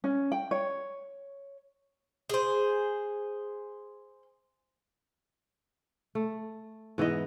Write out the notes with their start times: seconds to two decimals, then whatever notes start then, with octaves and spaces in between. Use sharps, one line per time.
0.04 C#4
0.32 G5
0.51 C#5
2.29 G#4 C5
6.15 A3
6.98 G#2 E3 B3 D#5